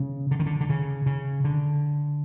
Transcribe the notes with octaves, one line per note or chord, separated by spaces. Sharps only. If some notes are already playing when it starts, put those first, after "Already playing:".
Already playing: C#3
D3
D#3
D3
D3
C#3
C#3
D3